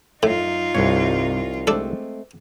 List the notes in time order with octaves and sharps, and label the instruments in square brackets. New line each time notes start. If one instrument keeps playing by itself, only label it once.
[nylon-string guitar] F#2 [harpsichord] A2 [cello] D#4 F4
[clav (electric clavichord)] C2 C#5 [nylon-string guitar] G2 C3 A#3
[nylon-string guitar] G#3 A3 C4 [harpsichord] D4 A4